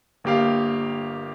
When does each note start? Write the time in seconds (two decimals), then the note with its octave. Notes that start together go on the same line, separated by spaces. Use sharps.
0.24 G1 A#3 G4 F5